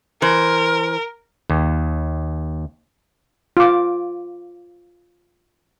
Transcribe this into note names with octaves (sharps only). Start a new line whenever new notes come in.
E3 A#4 C5
D#2
F4 D6